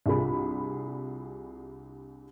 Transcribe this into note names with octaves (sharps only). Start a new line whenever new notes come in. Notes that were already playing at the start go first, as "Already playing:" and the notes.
C2 D4 F4 G#4 B5